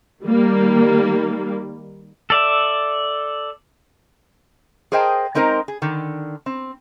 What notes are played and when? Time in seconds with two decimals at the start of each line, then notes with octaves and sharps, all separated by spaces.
0.23 D#3 G3 A#3
2.30 A4 D5 E5
4.92 G#4 A#4 C5 D#5 G5 A5
5.35 G#3 C4 D#4 A#4 C5
5.68 G#4
5.82 D3 D#3
6.46 C4